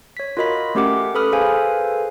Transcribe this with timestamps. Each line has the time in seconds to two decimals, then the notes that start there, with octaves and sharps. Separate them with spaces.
0.17 C#5 B6
0.37 F4 F#4 A#4 D#5 B5 B6
0.75 A3 C#4 G4 A#4 F#5 D6
1.15 A4 B4 B5 D#6 F6
1.32 G#4 A4 B4 C5 F5 G#5